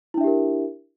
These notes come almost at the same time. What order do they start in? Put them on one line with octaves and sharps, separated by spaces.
E4 D4 E5 G4 A#4